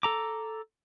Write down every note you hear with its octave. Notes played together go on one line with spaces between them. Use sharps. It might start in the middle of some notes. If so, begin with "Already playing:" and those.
A4 A#5 D6